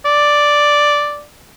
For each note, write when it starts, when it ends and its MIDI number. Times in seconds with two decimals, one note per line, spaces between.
0.05 1.23 74